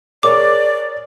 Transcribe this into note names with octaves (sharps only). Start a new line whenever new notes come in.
G#4 A#4 C#5 D5 D6